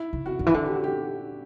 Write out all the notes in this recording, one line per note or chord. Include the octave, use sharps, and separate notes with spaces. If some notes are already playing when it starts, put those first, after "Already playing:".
Already playing: E4
C#3
F#4
D3
E3
D3
G4
F#4
G4